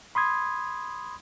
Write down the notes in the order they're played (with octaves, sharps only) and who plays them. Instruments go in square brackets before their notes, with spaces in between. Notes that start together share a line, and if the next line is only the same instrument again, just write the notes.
[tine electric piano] B5 C6 D#6 G#6